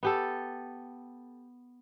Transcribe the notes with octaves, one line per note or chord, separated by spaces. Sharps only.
B3 G4 A4